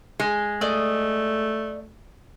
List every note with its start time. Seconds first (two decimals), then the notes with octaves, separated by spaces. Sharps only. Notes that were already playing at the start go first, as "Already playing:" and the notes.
0.20 G#3
0.61 A3 D5 D#5